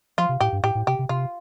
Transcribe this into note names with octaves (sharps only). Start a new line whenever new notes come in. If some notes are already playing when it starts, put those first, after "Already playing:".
F3 F4
C3
A2 G4
G2
A2 G4
A2
C3 G4
C3
C3 F4